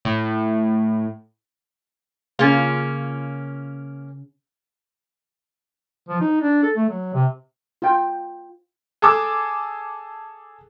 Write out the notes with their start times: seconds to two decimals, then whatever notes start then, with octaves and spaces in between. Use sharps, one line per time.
0.05 A2
2.39 C#3 A#3 C#4 F4
6.09 F3
6.21 D#4
6.41 D4
6.63 A4
6.77 A3
6.89 F#3
7.14 C3
7.82 F4 G5
9.02 G#4 A4 A5 D6 E6